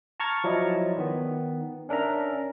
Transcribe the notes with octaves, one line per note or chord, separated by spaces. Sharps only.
A5 A#5 C#6 F6 G#6 A6
F3 F#3 E4 D5 D#5
D#3 B3
C#4 D4 A#4 E5 A#5